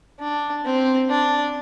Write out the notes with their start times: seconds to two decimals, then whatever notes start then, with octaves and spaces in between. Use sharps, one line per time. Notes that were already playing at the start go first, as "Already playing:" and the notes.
0.19 D4
0.65 C4
1.10 D4